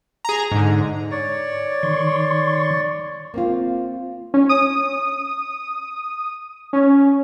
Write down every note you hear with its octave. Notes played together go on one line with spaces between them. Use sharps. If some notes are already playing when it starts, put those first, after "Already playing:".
G#4 A#5
G#2 D3
C#5 D5
D#3 C6 C#6
A#3 C4 F4
C#4
D#6
C#4